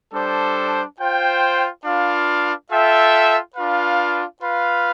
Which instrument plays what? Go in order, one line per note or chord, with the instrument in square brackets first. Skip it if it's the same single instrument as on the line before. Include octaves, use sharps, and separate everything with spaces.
[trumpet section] G3 D4 A4 C5
F4 C5 G5
D4 F4 B4 F5
F4 A4 E5 G5
D4 F4 B4 F5
F4 B4 F5